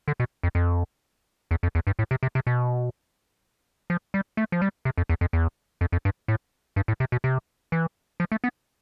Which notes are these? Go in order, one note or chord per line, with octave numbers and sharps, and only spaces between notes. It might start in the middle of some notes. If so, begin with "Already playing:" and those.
D3
B2
F2
F2
E2
F2
E2
G2
A2
C3
C3
C3
B2
F3
G3
A3
F3
G3
C3
F2
E2
F2
E2
F2
F2
G2
A2
G2
A2
C3
B2
C3
E3
F3
A3
B3